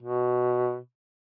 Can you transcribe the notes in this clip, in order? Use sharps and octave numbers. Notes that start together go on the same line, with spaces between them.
B2